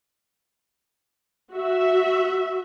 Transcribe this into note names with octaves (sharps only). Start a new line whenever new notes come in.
F#4 E5